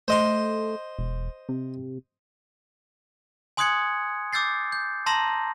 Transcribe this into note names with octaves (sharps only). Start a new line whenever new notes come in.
A3 C5 D#5 C6
E1
C3
G#5 C6 D#6 F#6 G#6 C#7
D6 E6 G6 A6 C7
G6
A5 A#5 C6 E6 A#6